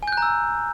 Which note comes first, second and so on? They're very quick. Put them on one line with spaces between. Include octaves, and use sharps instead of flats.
G#5 G6 F#6 A#5 E6